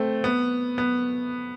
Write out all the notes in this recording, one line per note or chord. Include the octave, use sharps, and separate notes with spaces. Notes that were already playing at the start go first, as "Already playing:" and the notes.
Already playing: A3 C4
B3
B3